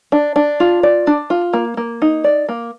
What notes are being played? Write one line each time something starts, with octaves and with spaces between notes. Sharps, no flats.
D4
D4
F4
D5
D4
F4
A#3
A#3
D#4
D5
A#3